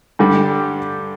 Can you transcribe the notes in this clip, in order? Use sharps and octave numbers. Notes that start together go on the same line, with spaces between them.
G2 D3 G3